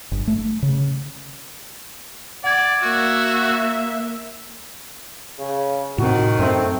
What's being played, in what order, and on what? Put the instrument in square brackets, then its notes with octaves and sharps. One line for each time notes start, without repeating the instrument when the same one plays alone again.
[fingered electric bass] G1
A3
C#3
[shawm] D5 [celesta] F#5 G#6
[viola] A#3 E5 [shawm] F#4
[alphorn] C#3
[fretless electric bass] A2 C3 C4 [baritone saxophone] D#3 [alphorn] F#4
[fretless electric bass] F#2 [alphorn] A3 [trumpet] C4